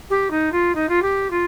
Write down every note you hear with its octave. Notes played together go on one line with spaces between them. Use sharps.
G4
D#4
F4
D#4
F4
G4
F4